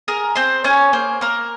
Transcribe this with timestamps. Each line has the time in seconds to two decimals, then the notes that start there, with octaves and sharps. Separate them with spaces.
0.08 G#4 A#4 A#5
0.36 C4 C5 C6
0.64 C#4 G#4 C#5
0.93 A#3 C5
1.21 A#3 A#4